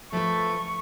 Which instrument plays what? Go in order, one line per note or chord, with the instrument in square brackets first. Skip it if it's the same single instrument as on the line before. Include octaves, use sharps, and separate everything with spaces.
[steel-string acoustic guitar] F3 B4 [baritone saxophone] A3 [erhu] C#6